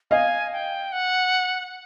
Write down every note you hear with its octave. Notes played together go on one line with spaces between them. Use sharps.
D#5 F5 G#5
G5
F#5